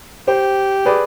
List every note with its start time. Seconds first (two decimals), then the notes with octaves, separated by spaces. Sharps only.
0.28 G4 C5
0.85 G#4 B4 D5